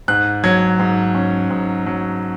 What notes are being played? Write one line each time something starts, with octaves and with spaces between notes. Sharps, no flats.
G#2 F#6
F#3 G#6
G#2
C#4
G#2
F#3